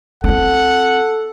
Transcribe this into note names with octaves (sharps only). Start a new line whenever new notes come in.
C4 F4 A4 F#5